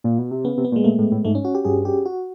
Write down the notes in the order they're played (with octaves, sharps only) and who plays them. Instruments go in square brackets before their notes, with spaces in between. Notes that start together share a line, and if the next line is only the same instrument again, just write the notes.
[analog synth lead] A#2
B2
C3
[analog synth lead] C#3 [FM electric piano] B3
[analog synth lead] C3
[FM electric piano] B3
[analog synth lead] A#2
[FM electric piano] G#3
[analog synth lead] A#2 [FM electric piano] A3
[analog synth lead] A2
A2
[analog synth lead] G#2 [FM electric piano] A3
[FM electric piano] C#4
F#4
G4
[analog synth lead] G2 [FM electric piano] G#4
[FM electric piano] G4
F#4